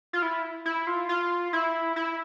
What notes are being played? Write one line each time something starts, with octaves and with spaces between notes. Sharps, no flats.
F4
E4
E4
F4
F4
E4
E4